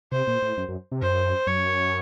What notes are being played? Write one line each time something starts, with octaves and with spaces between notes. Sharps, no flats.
C3 C5
A#2
A2
F#2
F#2
C3
F#2 C5
F#2 C#5